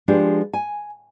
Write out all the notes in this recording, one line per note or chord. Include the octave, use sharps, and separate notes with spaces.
F3 G#3 D4 G4 B4
G#5